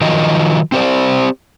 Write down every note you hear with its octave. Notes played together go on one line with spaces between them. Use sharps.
D#3 F3 F#3 D#5
C4 G4 C5 D5